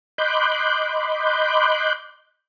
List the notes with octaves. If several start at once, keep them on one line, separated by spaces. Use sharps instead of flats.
D#5 B5 C6 D6 F#6 G6